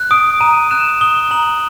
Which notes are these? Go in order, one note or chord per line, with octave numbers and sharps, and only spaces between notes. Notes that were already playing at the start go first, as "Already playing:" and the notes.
Already playing: F#6
D#6 D7
A#5 D#7
F#6 E7
D#6 G7
A#5 F#7